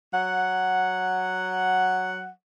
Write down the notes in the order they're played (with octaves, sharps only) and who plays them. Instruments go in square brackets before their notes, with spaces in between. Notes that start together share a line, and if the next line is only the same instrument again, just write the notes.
[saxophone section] F#3 F#5